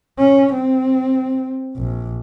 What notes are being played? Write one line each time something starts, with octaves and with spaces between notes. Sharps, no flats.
C#4
C4
A#1